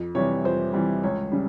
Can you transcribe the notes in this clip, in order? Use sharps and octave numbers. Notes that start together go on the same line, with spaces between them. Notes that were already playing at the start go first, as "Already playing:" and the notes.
Already playing: F2
C3 E3 G3 C#5
F2 C5
C3 E3 G3
C#2 C#5
C#3 G3